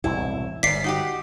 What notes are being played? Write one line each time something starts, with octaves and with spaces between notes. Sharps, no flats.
E1 C2 A2 E4
G1 G#2 D5 B6 C7
D#4 F#4 G4